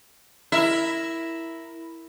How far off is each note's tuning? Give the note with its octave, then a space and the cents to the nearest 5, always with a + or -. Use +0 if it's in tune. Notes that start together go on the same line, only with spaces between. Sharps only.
E4 +0 A#4 +0 E5 +0